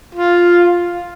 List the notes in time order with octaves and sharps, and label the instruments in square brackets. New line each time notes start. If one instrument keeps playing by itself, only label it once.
[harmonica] F4